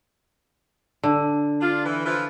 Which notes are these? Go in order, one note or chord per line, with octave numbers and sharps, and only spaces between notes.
D3
D4 F4
E3
E3 F3 F4